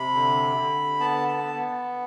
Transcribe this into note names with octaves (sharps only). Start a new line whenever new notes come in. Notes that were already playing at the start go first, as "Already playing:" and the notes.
Already playing: C3 B5
D3
D3
B3 A5
A5
B3